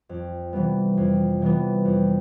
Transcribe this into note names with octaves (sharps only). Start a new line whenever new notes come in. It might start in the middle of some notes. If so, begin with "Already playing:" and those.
F2
C3 E3 G3 B3
F2
C3 E3 G3 B3
F2